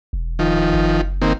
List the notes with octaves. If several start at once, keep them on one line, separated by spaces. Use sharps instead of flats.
E1
D#3 F3
F#1
D#3 A#3 C4